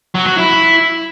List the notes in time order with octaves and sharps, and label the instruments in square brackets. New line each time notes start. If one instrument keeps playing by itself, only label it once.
[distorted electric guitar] F#3
F#4
E4